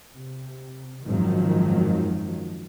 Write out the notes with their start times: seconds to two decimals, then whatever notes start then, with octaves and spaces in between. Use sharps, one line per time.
0.16 C3
1.06 G#1 F#2 D#3 F3 F#3